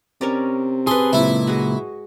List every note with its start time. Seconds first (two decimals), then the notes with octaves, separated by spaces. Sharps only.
0.21 C3 C#4 A#4 D5
0.87 G#4 A4 B4 C6
1.13 C#2 A#2 E4
1.47 G#3 F#4